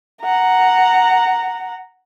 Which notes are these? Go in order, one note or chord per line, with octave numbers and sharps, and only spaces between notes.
F#5 A#5